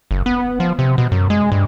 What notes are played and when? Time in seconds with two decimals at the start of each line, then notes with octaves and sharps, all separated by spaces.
0.11 F#1
0.26 B3
0.60 F3
0.79 C3
0.98 B2
1.12 F#2
1.30 G#3
1.52 G2